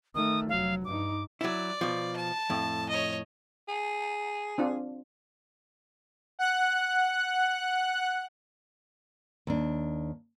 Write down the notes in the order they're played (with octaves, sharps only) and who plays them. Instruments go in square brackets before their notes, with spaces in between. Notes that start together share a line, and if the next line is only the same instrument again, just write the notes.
[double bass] D#3 A3 [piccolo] D#6
[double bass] F1 F#3 [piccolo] F5
[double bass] G2 D#4 [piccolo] D6
[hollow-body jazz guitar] F#3 E4 [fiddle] D5
[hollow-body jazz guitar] B2 F3
[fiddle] A5
[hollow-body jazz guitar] F2 A2
[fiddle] C#5 D#5
[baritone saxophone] G#4
[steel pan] C4 D4 F4
[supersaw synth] F#5 F#6
[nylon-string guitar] D#2 D4